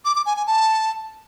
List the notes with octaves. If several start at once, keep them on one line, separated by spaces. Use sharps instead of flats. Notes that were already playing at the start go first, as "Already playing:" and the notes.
D6
D6
G#5
G#5
A5